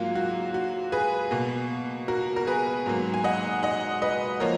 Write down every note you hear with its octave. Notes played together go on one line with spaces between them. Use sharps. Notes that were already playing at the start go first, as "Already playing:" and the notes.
Already playing: G#2 F#3 A#3 F4
F#4
F#4
G#4 B4
B2 A#3
F#4 A#4
A#4
G#4 B4
G#2 F#3 A#3
G#5
D#5 F#5
D#5 F#5
B4 D#5
F3 A#3 A#4 C#5